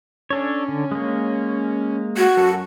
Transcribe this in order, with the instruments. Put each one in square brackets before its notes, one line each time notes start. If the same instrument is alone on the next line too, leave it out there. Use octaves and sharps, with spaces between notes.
[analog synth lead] C#4 [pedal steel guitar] D4 A4 C#5
[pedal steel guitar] D3
G#3 A#3
[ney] F#4 [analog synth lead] G#6
[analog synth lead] F#2 [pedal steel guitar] A4